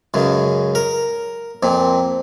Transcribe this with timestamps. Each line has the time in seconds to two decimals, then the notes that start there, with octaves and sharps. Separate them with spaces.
0.14 C#2 F#2 C#3
0.75 A#4
1.63 F2 A#2 C4